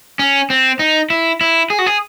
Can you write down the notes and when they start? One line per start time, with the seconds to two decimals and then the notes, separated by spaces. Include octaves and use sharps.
0.19 C#4
0.50 C4
0.79 D#4
1.10 E4
1.41 E4
1.70 G#4
1.79 F#4
1.86 G#4